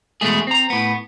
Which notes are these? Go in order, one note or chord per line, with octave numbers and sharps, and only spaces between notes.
E2 B2 G#3 A3 G#4
C4 A#5
A2 B3